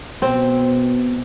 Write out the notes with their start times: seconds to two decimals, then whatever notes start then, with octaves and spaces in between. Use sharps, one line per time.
0.22 B2 C4